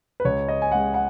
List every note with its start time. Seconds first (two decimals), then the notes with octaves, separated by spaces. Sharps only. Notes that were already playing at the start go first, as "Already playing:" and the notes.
0.20 B4
0.25 C#2 C#5
0.48 D#5
0.62 G#5
0.71 C#3 G#3 F#5
0.94 F#5